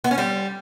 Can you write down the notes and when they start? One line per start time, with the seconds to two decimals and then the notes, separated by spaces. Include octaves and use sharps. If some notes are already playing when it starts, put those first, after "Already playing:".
0.04 B3
0.11 C#4
0.18 G3